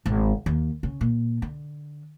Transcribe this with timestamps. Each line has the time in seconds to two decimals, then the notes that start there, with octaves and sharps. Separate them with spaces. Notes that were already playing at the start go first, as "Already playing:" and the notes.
0.06 G#1
0.46 D#2
0.83 C#3
1.01 A#2
1.42 D3